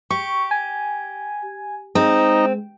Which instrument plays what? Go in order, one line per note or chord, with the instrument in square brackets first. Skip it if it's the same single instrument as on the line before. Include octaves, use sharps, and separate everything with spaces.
[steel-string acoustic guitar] G4 [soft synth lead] C#6
[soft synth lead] G#5
[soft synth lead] G#3 [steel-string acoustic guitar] C4 [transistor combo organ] D#4